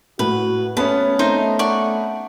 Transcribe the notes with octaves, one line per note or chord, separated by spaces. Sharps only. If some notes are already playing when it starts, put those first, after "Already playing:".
A2 F#4 B4
A3 B3 C#4 B4 A5 B5
A3 C4 D#4 C5 A#5
D5 F#5 C#6